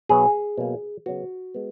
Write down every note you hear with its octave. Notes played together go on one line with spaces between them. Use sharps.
B2 F#3 B3 G#4
B2 F#3 A#3
C#3 F#3 B3 F#4
G#3 B3